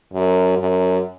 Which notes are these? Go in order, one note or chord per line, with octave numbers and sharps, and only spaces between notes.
F#2
F#2